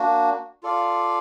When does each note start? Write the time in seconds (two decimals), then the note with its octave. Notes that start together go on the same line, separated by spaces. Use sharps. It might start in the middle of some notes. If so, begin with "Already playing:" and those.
Already playing: A#3 D4 F#4
0.63 F4 A4 D5 F5